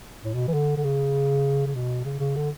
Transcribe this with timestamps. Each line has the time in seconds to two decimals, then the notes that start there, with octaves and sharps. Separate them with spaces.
0.24 A2
0.34 B2
0.48 E3
0.54 D3
0.77 D3
0.84 C#3
1.66 C#3
1.75 B2
2.05 C#3
2.20 C#3
2.36 D3